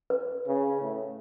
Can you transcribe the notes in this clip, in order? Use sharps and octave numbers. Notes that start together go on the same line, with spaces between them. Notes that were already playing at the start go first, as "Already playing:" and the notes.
B4
C#3
A2